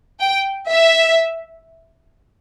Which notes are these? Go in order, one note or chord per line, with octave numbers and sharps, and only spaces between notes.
G5
E5